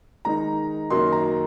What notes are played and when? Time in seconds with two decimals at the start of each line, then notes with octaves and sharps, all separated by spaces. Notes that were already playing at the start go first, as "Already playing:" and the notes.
0.25 D#3 G#3 D#4 A#5
0.90 F#2 D#3 F#3 A#3 D#4 C6
1.12 A#5